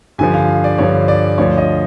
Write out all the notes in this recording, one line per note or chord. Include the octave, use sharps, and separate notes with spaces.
G2 D3 F3 G#5
F5
D5
G2 D3 F3 C#5
D5
D2 D3 F3 C#5
D#5